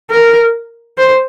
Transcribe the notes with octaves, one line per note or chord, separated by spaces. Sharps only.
A#4
C5